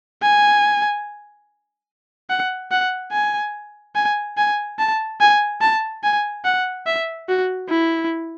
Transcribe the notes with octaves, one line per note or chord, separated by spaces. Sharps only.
G#5
F#5
F#5
G#5
G#5
G#5
A5
G#5
A5
G#5
F#5
E5
F#4
E4